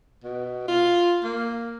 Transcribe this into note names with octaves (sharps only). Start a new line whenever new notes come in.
B2
F4
A#3